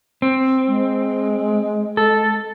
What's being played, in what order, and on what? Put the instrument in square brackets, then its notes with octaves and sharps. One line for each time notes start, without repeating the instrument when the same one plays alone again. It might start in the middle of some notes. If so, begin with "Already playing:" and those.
[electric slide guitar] C4
[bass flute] G#3
[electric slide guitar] A4